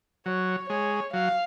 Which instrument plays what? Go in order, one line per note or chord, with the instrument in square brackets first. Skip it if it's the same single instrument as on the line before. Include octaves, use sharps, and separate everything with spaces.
[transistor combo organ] F#3 [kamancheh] C#5
[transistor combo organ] G#3 [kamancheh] C#5
[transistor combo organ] F#3 [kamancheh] F5